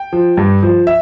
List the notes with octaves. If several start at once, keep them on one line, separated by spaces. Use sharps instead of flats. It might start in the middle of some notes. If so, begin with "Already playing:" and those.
Already playing: G5
F3
G2
F3
E5